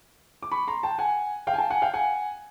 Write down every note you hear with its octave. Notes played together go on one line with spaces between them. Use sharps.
D6
B5 C#6
A#5 C6
G5 A5
F#5 G#5
F5 G5
G#5
G5 A5
F#5 G#5
F5 G5
F#5 G#5